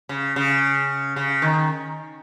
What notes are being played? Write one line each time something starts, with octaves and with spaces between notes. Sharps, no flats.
C#3
C#3
C#3
D#3